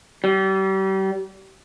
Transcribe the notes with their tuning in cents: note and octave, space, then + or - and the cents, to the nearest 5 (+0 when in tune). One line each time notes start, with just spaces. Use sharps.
G3 -35